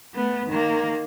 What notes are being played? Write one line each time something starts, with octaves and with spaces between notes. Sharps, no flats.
A3 B3
D#3 A#3